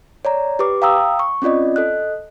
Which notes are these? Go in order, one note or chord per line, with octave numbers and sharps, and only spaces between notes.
C#5 D5 A#5
G4 B4 D6
F5 G5 A#5 D#6 E6
C#6
C4 C#4 F4 D5 D#5
A4 D#5 F#6